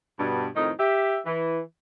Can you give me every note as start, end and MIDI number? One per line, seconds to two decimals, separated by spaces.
0.18 0.46 43
0.18 0.46 47
0.55 0.71 41
0.55 0.71 45
0.55 0.71 51
0.55 0.71 63
0.79 1.18 67
0.79 1.18 76
1.25 1.59 52